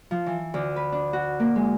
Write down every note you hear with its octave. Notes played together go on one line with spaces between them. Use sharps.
F3
E3
D2
B4
D4
F#4
A#3
G#3